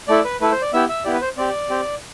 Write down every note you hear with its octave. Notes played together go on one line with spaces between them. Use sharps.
A3 E4 A4 D5
B4
A3 E4 A4 B4
C5
D5
B3 E4 G4 E5
E5
B3 E4 G4 D5
B4
C5
C4 G4 D5
C4 G4